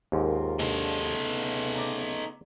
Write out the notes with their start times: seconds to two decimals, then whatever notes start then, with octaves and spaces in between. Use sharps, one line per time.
0.12 D#2 G#2 F4 A#4
0.59 A#3 D4 D#4 A4
0.99 C#3 A3 B3
1.75 D5 A#5